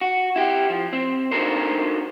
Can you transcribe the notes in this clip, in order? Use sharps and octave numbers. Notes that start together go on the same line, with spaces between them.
F#4
E4 G4
F3
C4
D4 D#4 F#4 A4 A#4 C5